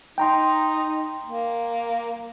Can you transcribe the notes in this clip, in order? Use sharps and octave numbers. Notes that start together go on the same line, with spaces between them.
D#4 G5 A#5 C6
A#3